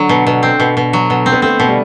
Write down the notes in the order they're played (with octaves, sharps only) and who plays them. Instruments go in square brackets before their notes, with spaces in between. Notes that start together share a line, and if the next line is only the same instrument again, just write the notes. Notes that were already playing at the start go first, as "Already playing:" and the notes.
Already playing: [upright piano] D3 [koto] F#3
[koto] B2
B2
C4
B2
B2
F#3
B2
C4
[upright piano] B3
[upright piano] A3 [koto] C4
[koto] B2
[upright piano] G3